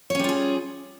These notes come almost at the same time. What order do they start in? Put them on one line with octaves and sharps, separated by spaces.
C#5 C#4 G3 F4 G#4